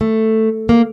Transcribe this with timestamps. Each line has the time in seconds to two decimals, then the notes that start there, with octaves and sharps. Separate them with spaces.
0.01 A3
0.69 A#3